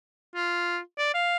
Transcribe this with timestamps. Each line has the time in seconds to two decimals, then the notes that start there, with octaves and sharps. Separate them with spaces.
0.35 F4
0.98 D5
1.14 F5